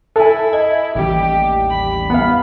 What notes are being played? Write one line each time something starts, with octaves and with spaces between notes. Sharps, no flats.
E4 A4 G#5
D#5 G#6
A1 D#2 G3 G4
B5
B3 F5